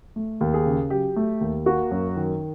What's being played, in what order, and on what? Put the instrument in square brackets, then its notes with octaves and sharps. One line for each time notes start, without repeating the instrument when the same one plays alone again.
[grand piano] A3
D#2
[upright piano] G#4
[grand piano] C#3
[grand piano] F#3 [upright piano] G4
[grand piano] A3
D#2
[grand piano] A#3 [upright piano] F#4
[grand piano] F#2
D#3